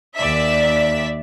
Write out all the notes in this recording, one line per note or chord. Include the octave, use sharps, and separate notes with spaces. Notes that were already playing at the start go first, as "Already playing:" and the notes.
D#2 D5 E5 B6